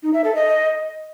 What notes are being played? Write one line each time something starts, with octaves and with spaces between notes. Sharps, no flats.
D#4
E5
A4
D#5